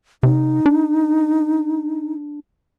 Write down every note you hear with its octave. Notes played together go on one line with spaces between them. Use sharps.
C3 D#4
D4